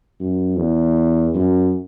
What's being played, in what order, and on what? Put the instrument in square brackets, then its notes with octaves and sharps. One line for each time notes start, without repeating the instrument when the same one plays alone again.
[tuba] F#2
E2
F#2